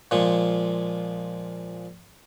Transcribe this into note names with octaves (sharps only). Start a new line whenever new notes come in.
A#2 F3 G#3 C#6